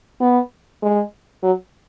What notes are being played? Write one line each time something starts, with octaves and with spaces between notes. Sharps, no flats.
B3
G#3
F#3